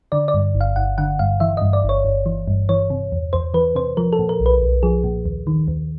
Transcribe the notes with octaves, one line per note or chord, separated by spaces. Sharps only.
D3 D5
D5
G2
G1
F5
G1 F#5
D3 F#5
G2 F5
E3 E5
G2 D#5
D5
G1
C#5
G1
E3
G2
E3 C#5
C3
E2
E2 C5
E3 B4
C3 C5
F3 A#4
A4
A#2
A#4
B1
B4
B1
F3 G#4
A#2
D#2
D#3
D#2